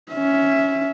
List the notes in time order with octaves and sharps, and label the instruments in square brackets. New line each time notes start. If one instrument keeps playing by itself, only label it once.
[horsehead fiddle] C#4 E5